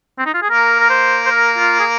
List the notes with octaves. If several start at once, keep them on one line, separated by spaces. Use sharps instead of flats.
C4
D#4
F4
G#4
A#3 A#4
A#4
C5
C5
A#4
F4
G#4